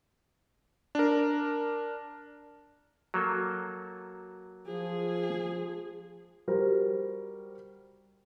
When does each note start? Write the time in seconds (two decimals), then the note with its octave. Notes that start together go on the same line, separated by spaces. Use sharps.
0.95 D4 A#4
3.14 F#3 A#3 A4
4.67 F3 G#4
6.48 G3 F#4 G4 A#4 C5